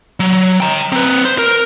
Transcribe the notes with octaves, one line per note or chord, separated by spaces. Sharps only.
F#3
G5 A#5
C4 B4
C5
A#4